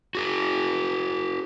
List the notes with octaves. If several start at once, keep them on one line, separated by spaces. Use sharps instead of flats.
F#4 G#4